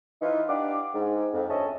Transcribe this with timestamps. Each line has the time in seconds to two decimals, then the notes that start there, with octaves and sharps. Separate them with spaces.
0.22 E3 D#4 F4
0.48 D4 G4 F5 F#5 D6
0.95 G#2
1.33 F2
1.49 D2 C#4 D#5 E5 A5